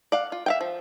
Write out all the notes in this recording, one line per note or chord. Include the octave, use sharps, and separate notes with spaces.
D5 F5 F#5
F4
E5 F5 G5
F3